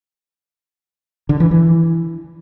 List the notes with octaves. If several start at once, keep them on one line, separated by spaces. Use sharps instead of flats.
D3
E3
E3